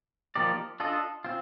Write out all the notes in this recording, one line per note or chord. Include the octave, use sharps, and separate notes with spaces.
F3 A#3 D#4 G4 D5
D4 F4 A4 D#5
C4 F4